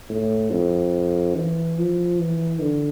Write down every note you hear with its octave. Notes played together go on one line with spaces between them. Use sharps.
A2
F2
E3
F3
E3
D3